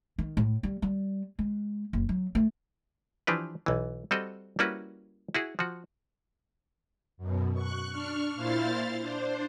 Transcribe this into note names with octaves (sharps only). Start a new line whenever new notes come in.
D#3
A2
G3
G3
G#3
F#1
F#3
A3
E3 F3 D4 G4 B4
B1 E3
G3 C4 F#4 A4 D#5
G3 A#3 C#4 E4 F#4 B4
E4 F#4 G#4
F3 F#4
F#2 B2
C#6 F#6
D4 C#6 F6
A#2 E4 C5 F5 F6 A6
D4 C5